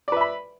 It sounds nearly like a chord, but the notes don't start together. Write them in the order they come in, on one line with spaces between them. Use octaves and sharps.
D5 B4 E5 B5